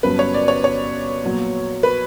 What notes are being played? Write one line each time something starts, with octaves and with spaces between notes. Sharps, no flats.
G1 G2 F#3 C#4 B4
C#5
D5
C#5
C#5
A#1 A#2 F#3 B3
B4